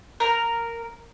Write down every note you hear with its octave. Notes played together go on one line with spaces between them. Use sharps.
A#4